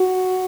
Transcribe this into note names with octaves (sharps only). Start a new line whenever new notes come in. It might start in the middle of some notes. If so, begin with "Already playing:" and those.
Already playing: F#4